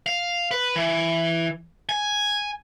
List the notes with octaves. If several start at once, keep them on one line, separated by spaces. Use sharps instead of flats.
F5
B4
E3
G#5